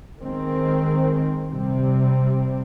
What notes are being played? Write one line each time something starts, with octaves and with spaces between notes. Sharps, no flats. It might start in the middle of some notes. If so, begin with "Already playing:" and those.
D#3 G#3 C4
C3 G3 C4